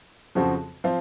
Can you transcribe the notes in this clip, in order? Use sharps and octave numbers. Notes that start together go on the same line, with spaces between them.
F2 C#3 F3 C4 F#4
F3 C4 F4